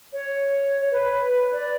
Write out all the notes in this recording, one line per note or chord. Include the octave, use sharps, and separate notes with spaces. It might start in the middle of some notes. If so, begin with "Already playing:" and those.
C#5
B4
D5